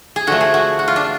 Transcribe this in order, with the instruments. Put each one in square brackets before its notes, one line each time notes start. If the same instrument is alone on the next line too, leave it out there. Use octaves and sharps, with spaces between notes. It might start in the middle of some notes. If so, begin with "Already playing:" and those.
[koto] G#4
D3 F3 A3 F#4
G#4
F#4
F#4
F4
D4